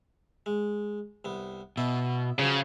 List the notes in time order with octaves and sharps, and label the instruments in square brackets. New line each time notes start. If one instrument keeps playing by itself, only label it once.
[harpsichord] G#3
C2 B3
[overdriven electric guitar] B2 [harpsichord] E4
[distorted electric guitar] C#3 [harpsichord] F3 F#3